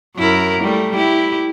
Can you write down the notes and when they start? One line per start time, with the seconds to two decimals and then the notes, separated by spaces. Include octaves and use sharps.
0.16 F#2 E4 A#4
0.61 G3 A3
0.94 E4 G4